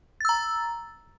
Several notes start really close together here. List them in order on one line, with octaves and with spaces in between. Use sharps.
A6 E6 A#5